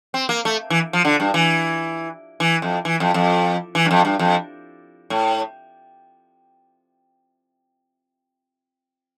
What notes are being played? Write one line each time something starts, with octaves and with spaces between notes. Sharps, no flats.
C4
A#3
A3
E3
F3
D3
G2
E3
E3
F2
E3
F2
F2
E3
G2
F2
G2
F2
A2